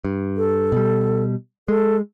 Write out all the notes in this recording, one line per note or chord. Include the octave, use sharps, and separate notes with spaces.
G2
A4
B2 G3
G#3 A4